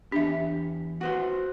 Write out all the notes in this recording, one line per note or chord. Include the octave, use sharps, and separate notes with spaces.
E2 D4 G4 E5
F#4 B4 C5 F#5